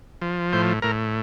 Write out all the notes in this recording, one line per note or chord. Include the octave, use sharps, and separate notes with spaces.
F3
A2 C5
A2 A#4